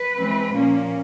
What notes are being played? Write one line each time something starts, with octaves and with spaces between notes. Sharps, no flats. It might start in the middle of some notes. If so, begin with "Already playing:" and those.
Already playing: B4
E3 G#3 C4
A#2 F3 A#3 C#4